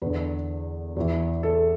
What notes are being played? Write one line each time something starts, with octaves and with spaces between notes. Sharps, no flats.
E2 D3 B4
E2 E3
A4